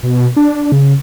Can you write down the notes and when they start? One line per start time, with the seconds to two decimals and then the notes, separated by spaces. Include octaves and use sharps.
0.03 B2
0.37 D4
0.72 C#3